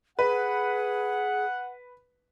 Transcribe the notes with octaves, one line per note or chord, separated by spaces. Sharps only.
G#4 B4 F#5